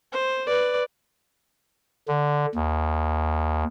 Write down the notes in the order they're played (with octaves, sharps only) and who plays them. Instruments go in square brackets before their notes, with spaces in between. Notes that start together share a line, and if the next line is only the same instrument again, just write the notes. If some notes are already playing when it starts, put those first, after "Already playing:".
[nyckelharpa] C5
B4 D5
[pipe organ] D3
D#2